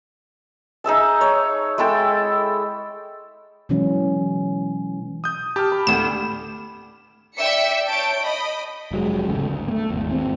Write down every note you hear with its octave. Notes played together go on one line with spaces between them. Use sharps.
D#4 G#4 E5 A5
C#5
G#3 E4 A4 G5
B2 E3 F#3 G#3 C#4
D#6 G6
G4 A5 F6
B5
D2 A2 E7
D5 E5 G5 E6 B6 C#7
C#5 A5 G6 D7
D#5 B5
F1 F#3 G#3
D1 G#1 C#3 A3
D2
A3 A#3
G#1 E2
D#2 C4